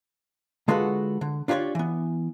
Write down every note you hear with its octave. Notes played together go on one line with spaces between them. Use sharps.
D3 G#3 F4 F#4 A4 B4
D3
D4 F4 G4 G#4 C#5 D5
E3 B3